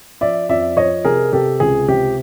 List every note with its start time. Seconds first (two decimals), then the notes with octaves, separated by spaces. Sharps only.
0.21 F3 D5 E5
0.49 F2 D5 E5
0.77 F3 C#5 D#5
1.04 C3 G#4 A#4
1.33 C3 G4 A4
1.60 C#2 G#4
1.88 C3 G4